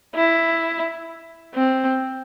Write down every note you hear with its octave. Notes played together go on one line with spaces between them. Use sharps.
E4
C4